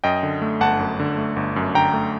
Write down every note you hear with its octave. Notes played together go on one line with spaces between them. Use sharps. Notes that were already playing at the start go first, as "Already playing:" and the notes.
F#2 D#5 G5
D3
A3
G1 F#5 A5
F#2
D3
A3
G1
F#2
D3 G5 A#5
A3